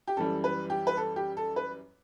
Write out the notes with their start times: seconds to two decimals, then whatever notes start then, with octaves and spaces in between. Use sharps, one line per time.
0.07 G4
0.17 F#2 E3 G3 A4
0.44 B4
0.70 G4
0.87 B4
0.97 A4
1.16 G4
1.37 A4
1.56 B4